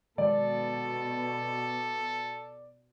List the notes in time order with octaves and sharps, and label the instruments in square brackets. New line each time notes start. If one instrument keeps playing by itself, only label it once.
[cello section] B2 [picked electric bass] D#3 F#3 G#3 [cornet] A4 [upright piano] D5